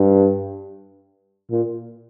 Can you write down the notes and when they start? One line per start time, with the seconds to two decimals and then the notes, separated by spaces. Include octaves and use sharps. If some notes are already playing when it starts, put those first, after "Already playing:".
Already playing: G2
1.51 A#2